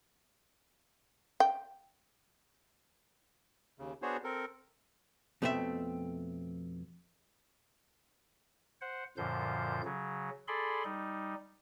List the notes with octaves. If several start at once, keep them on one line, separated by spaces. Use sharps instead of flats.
G5
D#2 C#3
B3 D4 F#4 G#4 C5 C#5
C4 A4 A#4
F2 B2 A3 C4 G#4 E5
C5 F#5
F#2 A#2 D3 F3 C5 G6
C#3 F#3
G#4 A4 D5 B5 C6
G3 D#4